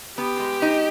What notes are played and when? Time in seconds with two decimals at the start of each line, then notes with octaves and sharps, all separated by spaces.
0.18 B3 G4
0.40 G#3
0.62 D#4